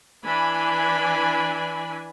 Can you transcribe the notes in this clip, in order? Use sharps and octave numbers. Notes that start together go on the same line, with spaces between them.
E3 D4 G#5 B5